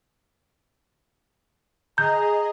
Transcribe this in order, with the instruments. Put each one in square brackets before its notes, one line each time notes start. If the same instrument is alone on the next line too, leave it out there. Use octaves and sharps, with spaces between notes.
[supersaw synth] G#4 D#5 [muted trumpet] A#5 [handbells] G6